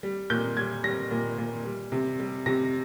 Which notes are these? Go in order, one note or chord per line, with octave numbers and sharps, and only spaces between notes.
G3
A#2 G6
G3 G#6
G3 A#6
A#2
A#2
G3
C3
G3
C3 A#6